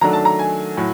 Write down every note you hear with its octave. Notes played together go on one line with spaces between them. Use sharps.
D#3 F#3 A3 D4 A#5
A5
A#5
G#5
A2 F#3